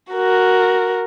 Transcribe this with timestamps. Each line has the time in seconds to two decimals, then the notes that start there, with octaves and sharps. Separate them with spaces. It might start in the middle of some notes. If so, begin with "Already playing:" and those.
0.12 F#4 A#4